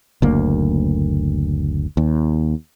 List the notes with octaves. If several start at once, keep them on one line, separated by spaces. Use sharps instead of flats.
F#1 D2 A#3
D#2